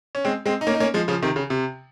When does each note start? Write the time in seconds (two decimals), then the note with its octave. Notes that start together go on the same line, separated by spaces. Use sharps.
0.15 C#4
0.25 G#3 C4
0.46 G#3 C4
0.61 D#4
0.67 A#3 C#4
0.74 D#4
0.80 A#3 C#4
0.94 F3 G#3
1.08 C#3 F3
1.22 C3 D#3
1.36 C#3
1.50 C3